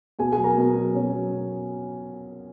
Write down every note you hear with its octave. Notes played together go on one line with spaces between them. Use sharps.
B2 G#4 G#5
G#4 G#5
F#3
A#4 A#5
B2
F#3
B2 C#4 C#5
F#3
B2